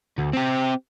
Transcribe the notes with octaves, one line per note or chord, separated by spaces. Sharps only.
D2
C4 G4